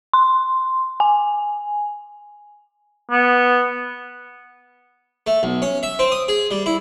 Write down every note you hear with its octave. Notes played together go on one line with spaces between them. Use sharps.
C6
G#5
B3
A3
B1
C#4
E5
C4
D#6
G#4
G3
E4